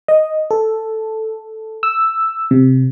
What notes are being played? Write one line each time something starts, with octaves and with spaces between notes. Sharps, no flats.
D#5
A4
E6
C3